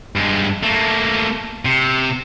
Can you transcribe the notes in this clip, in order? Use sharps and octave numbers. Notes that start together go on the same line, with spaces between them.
G2 G#3
A3 A#3
C3